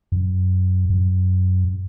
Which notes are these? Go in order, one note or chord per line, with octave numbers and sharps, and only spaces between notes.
F#2
F#2